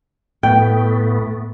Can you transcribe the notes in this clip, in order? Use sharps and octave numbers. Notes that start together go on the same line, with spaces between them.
A2 A3 B3 G5